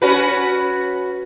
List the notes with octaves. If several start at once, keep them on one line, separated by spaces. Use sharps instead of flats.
C#4 F#4 B4